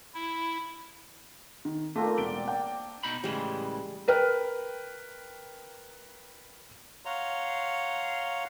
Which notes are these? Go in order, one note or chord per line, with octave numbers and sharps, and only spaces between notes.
E4
D#3
A3 A#3 C4 D4 F4
E1 D5 D7 G7
G5
B2 D#4 B5
A2 C#3 E3 G3 G#3
A#4 B4 G5 F6
C#5 F5 F#5 A#5 C6